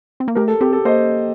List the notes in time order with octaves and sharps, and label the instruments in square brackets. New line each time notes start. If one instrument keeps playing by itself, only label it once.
[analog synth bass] C4
A#3
[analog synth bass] A3 [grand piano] G4 A#4
[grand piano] A4
[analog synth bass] C4 [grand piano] G4
[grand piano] A4
[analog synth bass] A#3 [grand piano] C5 D#5